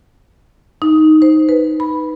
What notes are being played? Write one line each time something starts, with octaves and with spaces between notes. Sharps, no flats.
D#4
C5
B4
B5